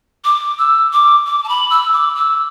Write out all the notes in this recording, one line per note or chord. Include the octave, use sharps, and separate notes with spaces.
D6
E6
D6
D6
A5
B5
E6
D6
E6